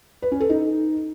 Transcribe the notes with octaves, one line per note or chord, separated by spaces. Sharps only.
B4
C#4
A4
D#4